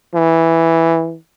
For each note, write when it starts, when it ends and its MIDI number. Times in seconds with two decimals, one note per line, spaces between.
0.15 1.16 52